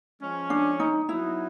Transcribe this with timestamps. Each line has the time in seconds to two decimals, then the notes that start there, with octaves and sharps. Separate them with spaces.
0.21 F3 G#3 C#4
0.50 D4
0.80 D#4
1.08 F#3 B3 D#4 E4